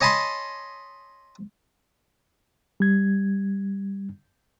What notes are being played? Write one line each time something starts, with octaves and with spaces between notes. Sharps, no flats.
C#5 D#5 G#5 A5 B5 C6
G3 G#6